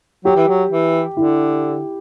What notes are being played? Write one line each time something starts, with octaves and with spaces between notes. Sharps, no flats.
F#3 G4
E3
F#3
E3
D3 E4